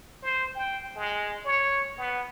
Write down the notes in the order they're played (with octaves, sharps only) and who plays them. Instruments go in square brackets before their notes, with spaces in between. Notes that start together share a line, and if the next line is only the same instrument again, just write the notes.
[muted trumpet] C5
G5
G#3
C#5
B3